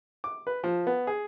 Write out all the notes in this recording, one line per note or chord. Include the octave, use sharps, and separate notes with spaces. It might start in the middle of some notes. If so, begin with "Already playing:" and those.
D6
B4
F3
B3
G#4